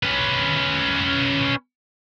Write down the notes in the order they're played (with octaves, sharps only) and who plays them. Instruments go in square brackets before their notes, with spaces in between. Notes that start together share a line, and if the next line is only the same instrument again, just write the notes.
[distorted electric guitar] C#4 B4